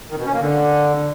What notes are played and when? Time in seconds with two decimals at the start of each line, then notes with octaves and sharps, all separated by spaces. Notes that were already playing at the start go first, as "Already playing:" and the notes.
0.10 D#3
0.18 B2
0.26 C#4
0.33 A#3
0.41 D3